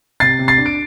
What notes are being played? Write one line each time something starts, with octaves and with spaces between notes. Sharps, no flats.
C3 A6 C7
C3
A6 C7
D4
D7